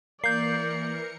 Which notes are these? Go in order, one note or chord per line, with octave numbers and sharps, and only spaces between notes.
E3 A#3 A#4 D5 G6 C7 C#7